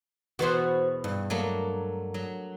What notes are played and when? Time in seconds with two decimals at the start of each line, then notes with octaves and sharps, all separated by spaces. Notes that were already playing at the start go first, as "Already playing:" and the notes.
0.39 E2 B2 F#4 B4 C5
1.04 G2
1.30 F#3 A3 A#3
2.14 F#3